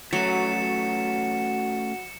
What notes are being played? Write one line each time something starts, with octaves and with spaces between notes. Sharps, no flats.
F#3 A3 C#4 F#4 C#7 E7